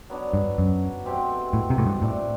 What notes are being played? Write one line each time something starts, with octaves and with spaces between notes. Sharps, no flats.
F#3 B3 D4
G2
F#2
B2 A3 C4 G4
A2
C3
A2
G2
A2 A3 D4 A4